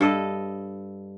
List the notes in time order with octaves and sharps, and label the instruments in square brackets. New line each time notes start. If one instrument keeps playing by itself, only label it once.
[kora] G2 A4 D#5